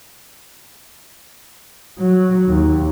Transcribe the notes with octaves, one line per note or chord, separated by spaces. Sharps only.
F#3
D#2